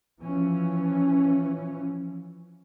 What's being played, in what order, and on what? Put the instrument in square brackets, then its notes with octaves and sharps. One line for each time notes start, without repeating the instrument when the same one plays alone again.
[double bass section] E3 F3 C#4